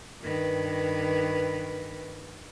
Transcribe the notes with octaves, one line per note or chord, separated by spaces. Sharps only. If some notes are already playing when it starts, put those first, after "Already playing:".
G2 D#3 B4